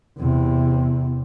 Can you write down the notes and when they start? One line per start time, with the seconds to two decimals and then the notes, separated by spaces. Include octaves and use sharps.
0.18 E2 C3